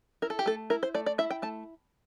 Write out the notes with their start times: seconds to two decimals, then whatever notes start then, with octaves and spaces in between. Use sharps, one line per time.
0.22 E4 A#4
0.30 A4
0.39 G4
0.46 A3 A4
0.70 E4 A#4
0.83 C5
0.94 A3 D5
1.06 D5
1.18 E4 E5
1.30 G5
1.42 A3 A5